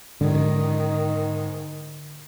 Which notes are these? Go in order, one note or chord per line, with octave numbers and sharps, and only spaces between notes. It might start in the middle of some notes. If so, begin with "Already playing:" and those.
G#2 D3 D#3 G#3 C#4